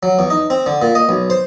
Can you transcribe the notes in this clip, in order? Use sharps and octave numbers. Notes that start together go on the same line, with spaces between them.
F#3
E2
D#4
C4
D3
A#2
D#5
B1
C5